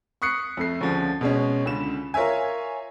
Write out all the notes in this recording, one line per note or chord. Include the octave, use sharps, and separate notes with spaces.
C#6 D#6 F#6 C7 C#7
F2 A3 C7
D2 C#3 F3
B2 G#3 C#4
C#2 D3 E7
F4 A#4 C#5 E5 G#5